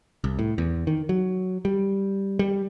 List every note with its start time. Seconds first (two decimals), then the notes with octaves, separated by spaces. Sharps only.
0.24 C2
0.39 A2
0.58 E2
0.87 D#3
1.09 F#3
1.65 G3
2.39 G3